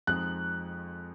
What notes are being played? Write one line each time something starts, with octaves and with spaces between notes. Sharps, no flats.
F2 F3 G#3 D#4 F#6